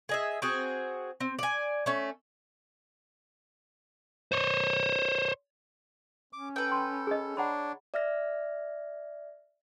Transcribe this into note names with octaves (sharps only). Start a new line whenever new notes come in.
G#4 D#5 E5
C4 F#4 G#4
C4
D5 G#5
A3 C#4
C5 C#5
C#4 D6
A4 B4 G5
C6
G#4 D#5
D4 C#5 F#5 A#5 B5
D5 E5 F6 A#6